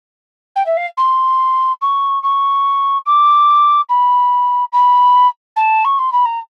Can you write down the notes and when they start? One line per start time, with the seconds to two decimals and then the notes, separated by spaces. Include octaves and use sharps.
0.55 G5
0.66 E5
0.77 F5
0.97 C6
1.81 C#6
2.23 C#6
3.06 D6
3.89 B5
4.72 B5
5.56 A5
5.84 C#6
5.98 C6
6.12 B5
6.25 A#5